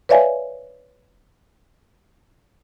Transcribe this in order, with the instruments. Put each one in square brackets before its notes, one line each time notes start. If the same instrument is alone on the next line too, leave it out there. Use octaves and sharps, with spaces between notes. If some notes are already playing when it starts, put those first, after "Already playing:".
[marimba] B4 C#5 D5 E5 F5 G#5